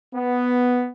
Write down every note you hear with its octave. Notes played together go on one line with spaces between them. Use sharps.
B3